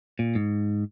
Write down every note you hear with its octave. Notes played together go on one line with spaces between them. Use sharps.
A#2
G#2